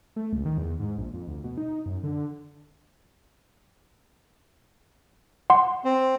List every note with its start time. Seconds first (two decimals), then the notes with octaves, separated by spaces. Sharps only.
0.16 A3
0.33 C#2
0.45 D#3
0.58 E2
0.80 G#2
0.98 A#1
1.14 F2
1.27 D2
1.44 B2
1.58 D#4
1.86 F#2
2.03 D3
5.50 F#5 C6
5.85 C4